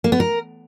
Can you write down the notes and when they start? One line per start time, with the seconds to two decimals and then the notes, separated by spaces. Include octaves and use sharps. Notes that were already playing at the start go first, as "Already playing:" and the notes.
0.04 A#3
0.12 B3
0.20 A#4